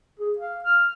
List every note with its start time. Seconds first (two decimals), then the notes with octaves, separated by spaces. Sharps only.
0.20 G#4
0.38 F5
0.64 F6